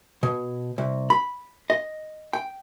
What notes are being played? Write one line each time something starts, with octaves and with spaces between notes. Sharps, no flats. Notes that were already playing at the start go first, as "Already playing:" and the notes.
B2
C2
B5
D#5
G5